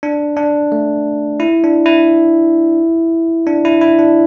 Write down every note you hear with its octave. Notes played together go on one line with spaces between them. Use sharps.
D4
D4
A3
E4
D4
E4
D4
E4
E4
D4